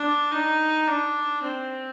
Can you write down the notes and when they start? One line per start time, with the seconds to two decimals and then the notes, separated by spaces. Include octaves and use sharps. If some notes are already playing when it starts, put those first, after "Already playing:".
Already playing: D4
0.31 D#4
0.87 D4
1.43 C4